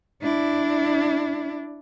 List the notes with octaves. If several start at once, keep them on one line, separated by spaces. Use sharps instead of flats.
D4 E4